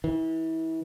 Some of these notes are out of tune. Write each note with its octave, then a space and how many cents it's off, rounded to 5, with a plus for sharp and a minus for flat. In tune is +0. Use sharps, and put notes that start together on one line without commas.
E3 -30